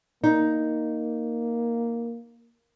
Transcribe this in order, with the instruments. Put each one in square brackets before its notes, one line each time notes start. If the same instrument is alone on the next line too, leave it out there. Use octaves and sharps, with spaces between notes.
[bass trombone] A#3 [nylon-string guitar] D#4